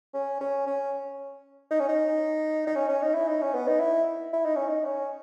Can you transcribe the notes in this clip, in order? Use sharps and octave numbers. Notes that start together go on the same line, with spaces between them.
C#4
C#4
C#4
D#4
C#4
D#4
D#4
C#4
C#4
D#4
E4
D#4
C#4
B3
D#4
E4
E4
D#4
C#4
D#4
C#4